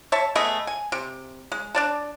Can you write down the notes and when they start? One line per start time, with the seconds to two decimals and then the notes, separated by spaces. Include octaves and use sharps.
0.12 C#5 E5 A5
0.35 A3 B3 G#4 D#5
0.67 G#5
0.92 C3
1.52 G#3
1.75 D4 D5 A5